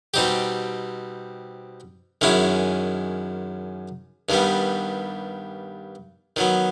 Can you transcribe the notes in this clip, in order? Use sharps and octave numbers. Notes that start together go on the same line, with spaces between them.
B2 G3 C4 D#4 G4
F#2 D#3 G#3 C#4 E4
G2 D#3 G3 B3
D#3 F#3 B3